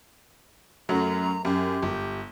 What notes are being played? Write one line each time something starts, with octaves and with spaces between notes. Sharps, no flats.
F#2 F#3 A3 A#5
F#2 G4
G1